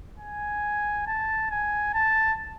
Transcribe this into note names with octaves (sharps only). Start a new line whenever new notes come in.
G#5
A5
G#5
A5